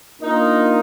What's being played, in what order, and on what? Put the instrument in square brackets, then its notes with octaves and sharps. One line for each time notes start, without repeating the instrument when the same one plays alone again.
[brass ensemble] A#3 D4 F4 A#4 [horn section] D#4